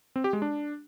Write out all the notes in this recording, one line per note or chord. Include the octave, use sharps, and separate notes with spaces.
C4
G4
G#3
D4